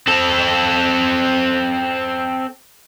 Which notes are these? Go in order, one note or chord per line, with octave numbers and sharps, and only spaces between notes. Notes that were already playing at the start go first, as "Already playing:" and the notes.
C4 A4